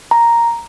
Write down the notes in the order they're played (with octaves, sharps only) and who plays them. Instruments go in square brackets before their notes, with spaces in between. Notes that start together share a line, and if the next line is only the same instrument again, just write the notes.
[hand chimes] A#5